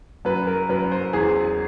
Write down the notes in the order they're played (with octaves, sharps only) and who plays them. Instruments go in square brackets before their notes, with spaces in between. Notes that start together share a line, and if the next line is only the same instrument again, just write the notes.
[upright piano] F#2 B4
A#4
F#2 B4
C5
E2 G#4